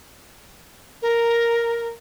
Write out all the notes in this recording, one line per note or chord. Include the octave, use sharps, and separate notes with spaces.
A#4